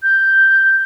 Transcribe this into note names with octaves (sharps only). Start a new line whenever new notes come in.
G6